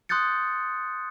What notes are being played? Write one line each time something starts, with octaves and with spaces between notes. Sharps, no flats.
C6 D#6 F#6 G6 A6 C#7